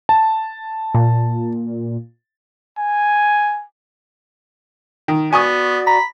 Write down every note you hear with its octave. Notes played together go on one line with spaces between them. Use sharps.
A5
A#2
G#5
D#3
B3 F#4 D5 G#5 C#6 D#6
A#5 B5